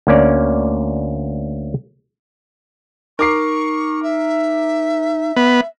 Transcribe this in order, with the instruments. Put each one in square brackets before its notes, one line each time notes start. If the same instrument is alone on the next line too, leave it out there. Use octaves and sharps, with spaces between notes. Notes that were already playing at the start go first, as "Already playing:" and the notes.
[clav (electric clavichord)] D2 A#3 C#4 D5
[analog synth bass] D#4 [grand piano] A#4 D6 C7 [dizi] C#6
[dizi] E5
[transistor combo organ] B3